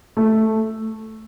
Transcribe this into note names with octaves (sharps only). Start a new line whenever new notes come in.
A3